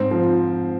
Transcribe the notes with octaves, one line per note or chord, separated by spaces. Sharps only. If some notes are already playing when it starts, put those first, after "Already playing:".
Already playing: G#2 C4
F3